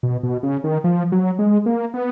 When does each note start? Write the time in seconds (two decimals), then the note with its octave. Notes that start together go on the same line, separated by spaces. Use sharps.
0.03 B2
0.23 B2
0.43 C#3
0.64 D#3
0.84 F3
1.12 F#3
1.39 G#3
1.66 A#3
1.94 B3